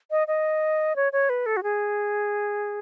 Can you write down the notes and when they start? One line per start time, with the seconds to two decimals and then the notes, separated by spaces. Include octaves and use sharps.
0.11 D#5
0.28 D#5
0.96 C#5
1.13 C#5
1.29 B4
1.46 A4
1.57 F#4
1.63 G#4